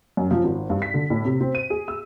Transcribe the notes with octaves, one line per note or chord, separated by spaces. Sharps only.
F#2
F3
G#1
G2
B6
D3
A2
C3
C4
D#7
G#4
E6